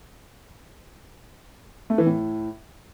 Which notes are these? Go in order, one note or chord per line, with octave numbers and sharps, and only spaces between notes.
A3
E3
A2